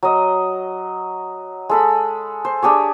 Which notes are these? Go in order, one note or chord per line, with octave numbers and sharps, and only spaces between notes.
F#3 D#5
G#3 A4 B5
C5
D4 G4 G#4 C#5